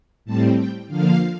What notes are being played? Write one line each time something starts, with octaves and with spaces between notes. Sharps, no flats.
A2 G3 C4 A5
G5
D3 F3 A#3 F5